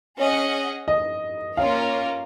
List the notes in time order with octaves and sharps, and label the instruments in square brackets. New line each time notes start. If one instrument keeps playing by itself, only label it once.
[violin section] C#4 G#4 D#5 F#5
[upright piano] D#5
[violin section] A#3 C#4 F4 A#4 C#5 [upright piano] F5